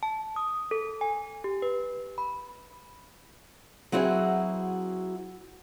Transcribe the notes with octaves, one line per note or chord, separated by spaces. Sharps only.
A5
D#6
A4
G#5
G4
B4
B5
F#3 C4 E4 F#4 G#4